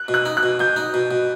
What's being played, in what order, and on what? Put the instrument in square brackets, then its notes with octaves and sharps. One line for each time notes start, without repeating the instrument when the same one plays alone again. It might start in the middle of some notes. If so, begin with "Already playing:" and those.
Already playing: [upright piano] F#6
[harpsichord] B2
[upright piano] F#6
[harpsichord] D#4
[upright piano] F#6
[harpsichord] B2
[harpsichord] B2 [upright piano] G6
[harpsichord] D#4
B2
B2